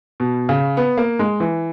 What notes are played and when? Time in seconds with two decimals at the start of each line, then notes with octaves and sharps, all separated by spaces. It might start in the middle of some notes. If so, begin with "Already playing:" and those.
0.20 B2
0.49 C#3
0.77 B3
0.98 A#3
1.19 G#3
1.40 E3